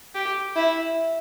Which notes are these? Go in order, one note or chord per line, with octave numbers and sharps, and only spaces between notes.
G4
E4